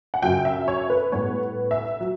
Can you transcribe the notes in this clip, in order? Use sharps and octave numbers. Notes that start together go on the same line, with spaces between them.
F#5
F#2 C#3 F#3 G5
E5
C#5
B4
A2 G3 B3 C#5
E5
F#3